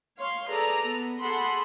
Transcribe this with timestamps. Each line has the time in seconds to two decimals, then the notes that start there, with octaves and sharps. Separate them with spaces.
0.19 C#5 F5 C6
0.49 G#4 A4 B4 D5 A#5
0.88 B3
1.21 G#4 A4 F#5 A5 B5 C6